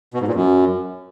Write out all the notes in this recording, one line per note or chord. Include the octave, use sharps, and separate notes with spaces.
B2
G#2
A#2
F#2